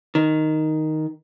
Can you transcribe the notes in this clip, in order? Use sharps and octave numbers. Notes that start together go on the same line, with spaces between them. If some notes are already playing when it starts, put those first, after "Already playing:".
D#3